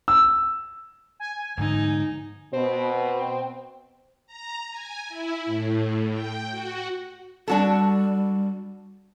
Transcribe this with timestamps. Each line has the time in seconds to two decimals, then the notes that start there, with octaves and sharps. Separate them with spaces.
0.08 E6
1.20 G#5
1.58 G#2 D3 F3 D#4
2.53 B2 C4
4.27 A#5
4.70 G#5
5.09 E4
5.46 A2
6.10 G5
6.51 F#4
7.48 G3 D4 F#4 A4